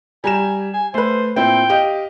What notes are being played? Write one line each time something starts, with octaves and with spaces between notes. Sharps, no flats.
G3 G#5 A#5 E7
G#5
A3 B4 C5
A#2 C4 E4 G5
G4 D#5 F5